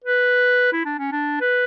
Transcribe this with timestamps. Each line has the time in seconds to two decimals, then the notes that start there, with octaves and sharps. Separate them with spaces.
0.04 B4
0.73 E4
0.85 D4
0.99 C#4
1.12 D4
1.41 B4